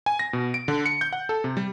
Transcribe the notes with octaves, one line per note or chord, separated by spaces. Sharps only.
G#5
A#6
B2
D7
D3
C#7
G6
F#5
A4
C3
G3